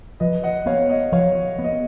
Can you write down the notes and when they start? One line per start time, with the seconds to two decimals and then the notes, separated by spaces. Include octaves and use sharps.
0.20 F3 B4 D#5
0.43 D#5 F#5
0.66 B3 C#5 F5
0.89 D#5 F#5
1.12 F3 C#5 F5
1.59 B3
1.64 D#5